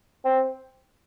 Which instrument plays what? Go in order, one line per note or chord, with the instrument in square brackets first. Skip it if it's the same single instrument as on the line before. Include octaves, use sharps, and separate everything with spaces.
[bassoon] C4